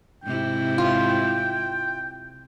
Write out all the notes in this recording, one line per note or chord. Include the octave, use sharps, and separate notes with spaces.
G#2 C3 E4 G5
F4